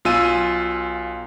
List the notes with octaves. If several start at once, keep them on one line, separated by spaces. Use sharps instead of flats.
B1 F4 G#5 E6 D#7